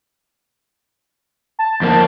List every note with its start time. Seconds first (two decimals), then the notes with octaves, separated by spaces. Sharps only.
1.59 A5
1.81 F2 A#3